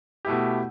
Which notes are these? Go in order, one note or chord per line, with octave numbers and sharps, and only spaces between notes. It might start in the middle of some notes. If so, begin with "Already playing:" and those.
B2 A3 E4 G4